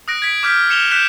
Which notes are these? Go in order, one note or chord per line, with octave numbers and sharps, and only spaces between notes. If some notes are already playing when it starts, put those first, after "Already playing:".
D#6 F#6 A#6 D7
G#6 B6 D7
D6 F6 G6 G#6 B6
C#7 E7 F7 G7
F#6 G6 B6 E7